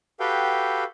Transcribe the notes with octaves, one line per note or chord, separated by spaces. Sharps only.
F#4 G4 A4 B4 F5 G5